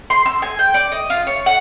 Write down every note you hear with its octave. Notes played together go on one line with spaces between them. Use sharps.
C6
E6
G#5
G5
D5
D#5
F4
C#5
F#5